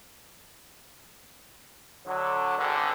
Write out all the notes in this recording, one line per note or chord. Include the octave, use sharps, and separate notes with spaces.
D3 F#3
G#1 D3